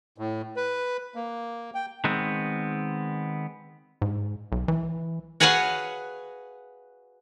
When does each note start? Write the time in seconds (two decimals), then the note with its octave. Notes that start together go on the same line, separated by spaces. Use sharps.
0.18 A2
0.56 B4
1.15 A#3
1.74 G5
2.04 D#3 G#3 B3 C4
4.02 G#2
4.52 B1
4.68 E3
5.40 F#4 G#4 B4 C#5 F5 F#5